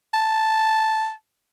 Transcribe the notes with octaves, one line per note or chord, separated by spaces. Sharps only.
A5